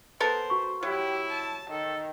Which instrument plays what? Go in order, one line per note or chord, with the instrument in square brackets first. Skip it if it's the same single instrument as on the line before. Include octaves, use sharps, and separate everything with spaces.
[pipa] B3 A4 A#4 [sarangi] C5
[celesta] F#4 C#6
[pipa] F#3 [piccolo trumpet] E4 [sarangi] G4
[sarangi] A5
[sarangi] D#3 [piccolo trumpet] A4